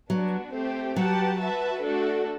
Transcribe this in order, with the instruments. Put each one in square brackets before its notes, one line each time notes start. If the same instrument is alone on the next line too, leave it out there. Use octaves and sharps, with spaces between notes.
[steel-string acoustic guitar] F#3 [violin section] B3 D4 F#4
[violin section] A3 C4 G4 C5
[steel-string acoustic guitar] F#3 [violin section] G4 B4 F#5 A5
[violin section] F#4 B4 E5 A5
A3 D4 F#4 A4